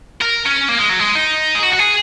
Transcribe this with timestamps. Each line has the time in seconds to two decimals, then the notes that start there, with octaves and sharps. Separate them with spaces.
0.21 A#4
0.46 C#4
0.69 A#3
0.78 G#3
0.90 F#3
1.00 G#3
1.15 D#4
1.55 G#4
1.63 F#4
1.73 F#4
1.79 G#4